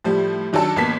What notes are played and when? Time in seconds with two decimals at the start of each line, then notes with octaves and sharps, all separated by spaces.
0.04 A2 F3 G3
0.53 D#3 F#3 D4 A4
0.76 A1 A#3 B3 A5 B6